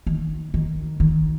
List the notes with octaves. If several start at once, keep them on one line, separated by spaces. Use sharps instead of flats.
D#3
D#3
D#3